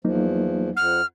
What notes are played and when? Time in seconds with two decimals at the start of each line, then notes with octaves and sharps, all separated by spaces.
0.05 E2 F3 F#3 A#3 D#4
0.77 F2 F#5 F6